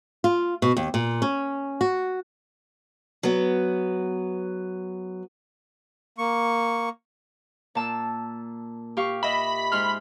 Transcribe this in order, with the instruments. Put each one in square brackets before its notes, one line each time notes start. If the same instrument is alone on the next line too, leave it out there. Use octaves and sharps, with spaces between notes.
[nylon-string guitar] F4
B2
D#2
A#2
C#4
F#4
[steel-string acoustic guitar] F#3 B3
[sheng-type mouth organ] A#3 C#6
[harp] A#2 A5 E6
G4 F5 C#6
[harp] D#5 E5 [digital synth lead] B5
[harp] G#2 C6 F6